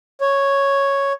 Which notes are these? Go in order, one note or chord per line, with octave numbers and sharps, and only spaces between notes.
C#5